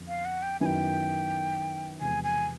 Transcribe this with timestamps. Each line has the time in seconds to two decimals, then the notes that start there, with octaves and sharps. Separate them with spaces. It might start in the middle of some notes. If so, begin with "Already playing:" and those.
Already playing: F2 D3 F3 B3
0.08 F5
0.25 F#5
0.43 G5
0.60 F#2 D#3 F#3 B3 E4 G#5
0.66 G5
2.01 E2 C3 F3 G#3 B3 G#5
2.24 G#5